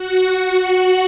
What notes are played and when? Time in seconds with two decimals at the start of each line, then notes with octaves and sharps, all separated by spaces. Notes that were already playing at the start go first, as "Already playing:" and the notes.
Already playing: F#4 F#5
0.53 F#4 F#5